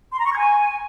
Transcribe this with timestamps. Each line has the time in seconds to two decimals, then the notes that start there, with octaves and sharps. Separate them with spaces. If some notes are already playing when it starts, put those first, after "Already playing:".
0.12 C6
0.18 A#5
0.25 C#6
0.31 G#6
0.38 G#5